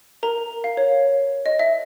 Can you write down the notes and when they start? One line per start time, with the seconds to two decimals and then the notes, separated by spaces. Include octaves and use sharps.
0.23 A#4 A#5
0.64 F5
0.77 C#5
1.46 D#5
1.59 E5